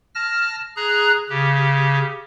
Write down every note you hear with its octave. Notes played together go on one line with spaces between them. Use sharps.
A5 F6 A#6
G#4 A#5 F#6
C#3 G4